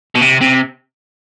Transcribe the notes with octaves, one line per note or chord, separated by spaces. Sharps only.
B2
C3
C3